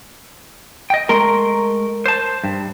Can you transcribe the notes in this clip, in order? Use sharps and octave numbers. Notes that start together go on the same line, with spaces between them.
D#5 G5
G#3 A3 A#4 C6
C5 A5
G2